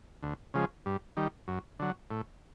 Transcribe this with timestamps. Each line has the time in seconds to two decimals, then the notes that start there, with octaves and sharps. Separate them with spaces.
0.23 D2
0.54 C#3 F3 G#3
0.86 G2
1.17 D#3 G3
1.48 F#2
1.79 D3 F#3
2.11 A2